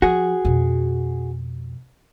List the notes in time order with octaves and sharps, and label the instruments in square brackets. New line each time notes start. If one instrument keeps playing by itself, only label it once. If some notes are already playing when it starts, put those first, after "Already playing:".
[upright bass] F3 [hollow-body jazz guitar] F#4 G#4
[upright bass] F2 B2